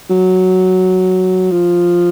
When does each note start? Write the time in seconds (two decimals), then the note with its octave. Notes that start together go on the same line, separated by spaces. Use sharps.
0.10 F#3
1.52 F3